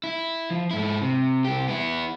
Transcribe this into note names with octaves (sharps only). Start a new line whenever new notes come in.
E4
F3
G#2 E4
C3
C2 G4
B3 E4